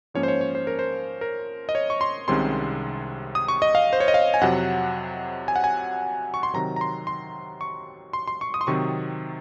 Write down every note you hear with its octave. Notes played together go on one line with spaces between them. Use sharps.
G#2 F3 A#3 C#4 C#5
C5
C#5
C#5
C5
A#4
C5
A#4
D#5
C#5
C#6
C6
C2 C3 D#3 G#3 C#4 C6
D#6
C#6
D#5
F5
C5
C#5
D#5
F5
G#5
F2 C3 F#3 F#5
G#5
F#5
G#5
C#6
C6
C3 D#3 F#3 A#5
A#5
C6
C6
C#6
C6
C6
C#6
D#6
C6
C3 D#3 F#3 C4 C#6